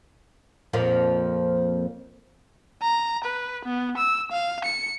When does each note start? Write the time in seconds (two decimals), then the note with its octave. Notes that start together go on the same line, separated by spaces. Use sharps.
0.73 F2 A#2 F3
2.82 A#5
3.24 B4
3.65 B3
3.97 E6
4.32 F5
4.64 C#7